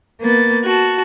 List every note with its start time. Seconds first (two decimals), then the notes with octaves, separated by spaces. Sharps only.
0.21 A#3 B3 A6
0.65 F#4 A5